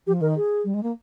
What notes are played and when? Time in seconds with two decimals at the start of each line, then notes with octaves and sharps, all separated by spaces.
0.07 F3 G4
0.21 D#3 A#4
0.36 G#4
0.64 G3
0.74 G#3
0.83 A#3